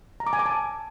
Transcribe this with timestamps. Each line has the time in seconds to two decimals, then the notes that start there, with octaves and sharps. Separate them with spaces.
0.20 A#5
0.27 D6
0.33 G#5
0.39 D6
0.46 A5